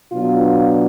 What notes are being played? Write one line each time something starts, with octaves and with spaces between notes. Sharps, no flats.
B2 F#3 B3 D4 F4
F4